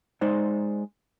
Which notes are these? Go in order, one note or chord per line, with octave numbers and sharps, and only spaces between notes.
G#3 D#4 C5 D5